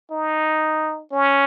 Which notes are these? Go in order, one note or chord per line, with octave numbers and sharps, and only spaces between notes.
D#4
C#4